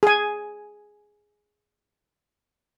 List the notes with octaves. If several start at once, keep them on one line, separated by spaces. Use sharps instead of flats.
G#4 G#5